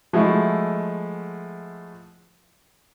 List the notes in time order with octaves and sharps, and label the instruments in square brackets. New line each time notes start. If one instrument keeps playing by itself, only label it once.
[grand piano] F3 G#3 A3 E4 F#4